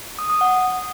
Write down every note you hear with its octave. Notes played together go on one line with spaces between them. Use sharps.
D#6
D#6
F#5